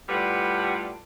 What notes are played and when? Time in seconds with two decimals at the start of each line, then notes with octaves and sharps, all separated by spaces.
0.09 A2 G3 D4 F4 B4 F#5